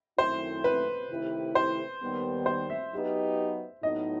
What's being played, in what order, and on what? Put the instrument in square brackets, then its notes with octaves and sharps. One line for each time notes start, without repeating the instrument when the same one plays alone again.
[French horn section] F#2 D#3 A3 C4 E4 [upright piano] C5
[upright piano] B4
[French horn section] C3 D#3 A3 E4 G4
[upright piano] C5
[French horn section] D#2 D#3 G3 B3
[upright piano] C5
E5
[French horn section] F#3 B3 D#4 G4 B4
[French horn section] A2 F#3 B3 D#4 [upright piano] D#5